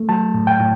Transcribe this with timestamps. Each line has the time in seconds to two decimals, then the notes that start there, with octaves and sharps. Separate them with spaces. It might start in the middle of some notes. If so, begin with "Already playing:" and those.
Already playing: A3
0.09 F#3 A5
0.34 A2
0.47 G5
0.60 A2